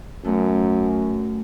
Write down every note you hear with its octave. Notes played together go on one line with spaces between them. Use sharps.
F#2 A3 B3